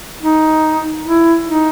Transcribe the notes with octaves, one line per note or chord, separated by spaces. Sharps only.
D#4
E4
D#4